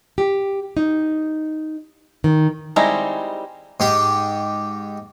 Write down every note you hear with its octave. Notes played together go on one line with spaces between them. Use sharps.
G4
D#4
D#3
G3 G#3 C4 D#4 E4
G#2 G4